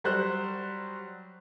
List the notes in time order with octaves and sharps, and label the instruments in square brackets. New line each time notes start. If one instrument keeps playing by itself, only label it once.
[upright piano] F#3 G3 C5 F#6